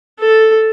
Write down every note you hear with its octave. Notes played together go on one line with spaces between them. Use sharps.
A4